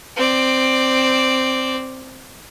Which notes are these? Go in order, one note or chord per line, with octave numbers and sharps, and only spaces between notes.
C4 D5